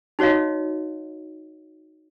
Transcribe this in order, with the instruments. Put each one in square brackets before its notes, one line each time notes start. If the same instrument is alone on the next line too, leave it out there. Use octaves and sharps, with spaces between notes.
[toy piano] D#4 F#4 C#5 D#5 F5